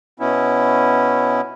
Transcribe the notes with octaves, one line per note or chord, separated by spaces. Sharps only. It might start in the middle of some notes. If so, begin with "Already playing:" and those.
B2 B3 C#4 E4